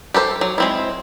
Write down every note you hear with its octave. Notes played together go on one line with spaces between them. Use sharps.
G4 A4 B4 C5
F#3
G#3 C4 E4